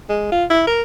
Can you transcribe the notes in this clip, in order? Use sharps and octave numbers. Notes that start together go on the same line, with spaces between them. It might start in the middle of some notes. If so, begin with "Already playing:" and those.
G#3
F4
E4
A#4